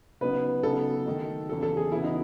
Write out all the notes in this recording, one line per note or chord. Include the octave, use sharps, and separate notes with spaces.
C#3 F#3 B3 D#4 B4
C#3 F#3 B3 D#4 A4
D#3 A3 D#4
E2 C#3 F#3 A4
A4
G#4
E2 C#3 F#3 B3 E4
D#4